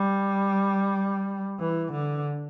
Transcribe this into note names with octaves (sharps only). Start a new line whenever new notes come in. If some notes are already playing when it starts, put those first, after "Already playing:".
Already playing: G3
E3
D3